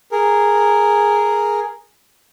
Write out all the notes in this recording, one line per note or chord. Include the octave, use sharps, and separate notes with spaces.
G#4 A#4